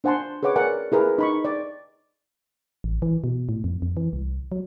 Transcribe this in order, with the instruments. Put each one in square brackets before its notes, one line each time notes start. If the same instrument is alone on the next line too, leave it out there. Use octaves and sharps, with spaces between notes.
[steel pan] D4 C5 F#5 G#5 A5 C6
G#4 B4 C#5 F#5 D6
A#4 D5 F#5 G#5
E4 G#4 A#4 B4
D#4 B5 C#6
D5
[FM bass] A1
E3
B2
A2
F2
F2
E3
C2
F#3